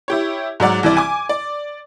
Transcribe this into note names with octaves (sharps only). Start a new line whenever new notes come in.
E4 G4 C#5
G#2 F#3 D5 F#5
C2 E3 E4 D5
G#5 D6
D5